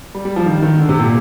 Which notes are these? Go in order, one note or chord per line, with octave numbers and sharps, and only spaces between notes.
G3
G3
F3
D#3
D#3
D3
C3
A#2